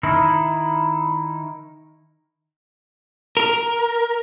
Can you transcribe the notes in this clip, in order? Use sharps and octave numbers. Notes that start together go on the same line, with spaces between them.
D#3 D#4 E4
A#4